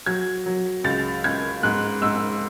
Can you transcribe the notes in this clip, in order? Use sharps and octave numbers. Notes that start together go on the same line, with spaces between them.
F#3 G#6
F#3
C#2 A6
C#2 G#6
G#2 F#6
G#2 E6